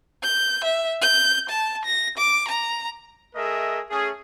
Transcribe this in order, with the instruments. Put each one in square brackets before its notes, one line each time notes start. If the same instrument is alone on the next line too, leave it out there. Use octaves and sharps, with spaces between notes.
[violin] G6
E5
G6
A5
A#6
D6
A#5
[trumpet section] A3 G#4 A#4 D#5 E5
A3 C#4 G#4